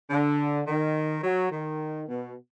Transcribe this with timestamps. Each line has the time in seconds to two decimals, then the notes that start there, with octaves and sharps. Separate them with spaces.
0.10 D3
0.67 D#3
1.24 F#3
1.51 D#3
2.08 B2